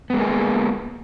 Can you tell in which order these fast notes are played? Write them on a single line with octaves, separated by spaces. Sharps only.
B3 G#3 A#3 G#4